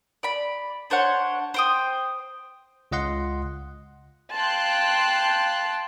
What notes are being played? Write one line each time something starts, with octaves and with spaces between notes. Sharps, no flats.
D5 B5
D4 C5 C#5 F#5
C5 G5 D#6
C#2 F4 D#5 F#5 C6
F5 G5 A5 C6 F#6